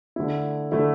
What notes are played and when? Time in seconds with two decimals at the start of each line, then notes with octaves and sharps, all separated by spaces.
0.16 D3 A3 E4
0.72 D3 A3 E4